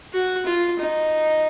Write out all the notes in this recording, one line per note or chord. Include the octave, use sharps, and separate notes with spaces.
F#4
F4
D#4